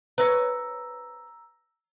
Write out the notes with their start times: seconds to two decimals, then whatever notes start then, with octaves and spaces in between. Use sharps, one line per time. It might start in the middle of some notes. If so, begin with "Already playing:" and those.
0.18 B4 C#5 A#5 E6 A#6